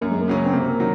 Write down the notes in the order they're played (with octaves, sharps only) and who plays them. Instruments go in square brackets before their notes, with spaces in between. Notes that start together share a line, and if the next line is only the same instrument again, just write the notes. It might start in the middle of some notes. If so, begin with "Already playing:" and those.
[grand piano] F#2 [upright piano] A#3
[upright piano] G#3
A#3
[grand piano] C#3 F#3 C#4
[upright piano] C4
[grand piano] C3 [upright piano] A#3
[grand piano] D#3 F#3